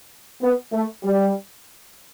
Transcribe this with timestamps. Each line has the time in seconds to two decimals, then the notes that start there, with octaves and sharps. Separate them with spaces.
0.42 B3
0.73 A3
1.04 G3